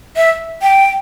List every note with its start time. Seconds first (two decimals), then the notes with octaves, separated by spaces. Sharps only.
0.16 E5
0.62 G5